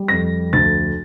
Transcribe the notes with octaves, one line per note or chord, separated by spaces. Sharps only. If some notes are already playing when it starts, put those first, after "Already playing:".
Already playing: G3
F2 A#6
D2 A6